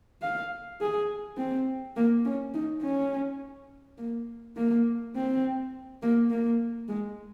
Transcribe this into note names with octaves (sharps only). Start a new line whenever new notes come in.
F5
G#4
C4
A#3
C#4
D#4
C#4
A#3
A#3
C4
A#3
A#3
G#3